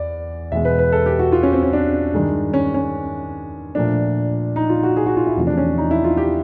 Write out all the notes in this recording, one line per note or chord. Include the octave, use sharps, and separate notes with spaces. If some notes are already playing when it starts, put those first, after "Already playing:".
Already playing: E2 D5
E2 B2 G#3 E5
B4
B4
A4
G4
F#4
F4
C#4
C4
C#4
D4
G2 D#3 G#3
C#4
C#4
A#2 F3 A3 D4
D#4
F4
F#4
G#4
F#4
F4
E4
E2 C3 F3 A3
D4
C#4
D#4
E4
F4
G4